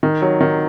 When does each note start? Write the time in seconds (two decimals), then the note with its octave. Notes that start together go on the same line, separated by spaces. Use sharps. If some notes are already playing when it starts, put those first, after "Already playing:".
0.03 D#3
0.22 F#3
0.40 D#3